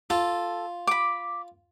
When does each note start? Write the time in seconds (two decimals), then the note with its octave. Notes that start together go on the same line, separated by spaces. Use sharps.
0.10 F4 A4
0.87 B5 D6